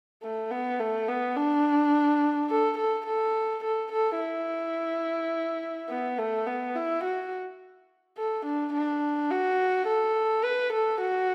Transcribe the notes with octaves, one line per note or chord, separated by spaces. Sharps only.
A3
B3
A3
B3
D4
A4
A4
A4
A4
A4
E4
B3
A3
B3
E4
F#4
A4
D4
D4
F#4
A4
B4
A4
F#4